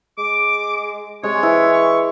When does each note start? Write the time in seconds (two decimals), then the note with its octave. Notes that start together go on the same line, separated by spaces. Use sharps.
0.18 G#3 D6
1.23 C3 G#3 C#5
1.43 E3 E4
1.73 C#6